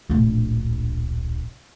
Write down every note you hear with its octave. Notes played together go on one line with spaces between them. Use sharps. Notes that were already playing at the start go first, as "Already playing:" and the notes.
D1 A#1